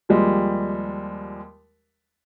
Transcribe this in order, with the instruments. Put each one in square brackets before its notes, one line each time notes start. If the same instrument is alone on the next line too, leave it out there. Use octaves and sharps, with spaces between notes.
[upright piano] D#2 F3 G3 G#3